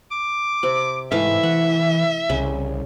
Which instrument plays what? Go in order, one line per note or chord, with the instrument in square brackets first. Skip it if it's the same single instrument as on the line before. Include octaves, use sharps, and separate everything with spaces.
[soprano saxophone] D6
[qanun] C3 C4
[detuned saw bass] G#2 [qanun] E3 A3 F5 [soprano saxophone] E5
[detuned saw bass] E3 [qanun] F#5
[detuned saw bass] C2 [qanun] C#3